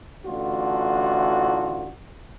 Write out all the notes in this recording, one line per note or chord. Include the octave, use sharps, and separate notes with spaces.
A1 A2 D3 F4 F#4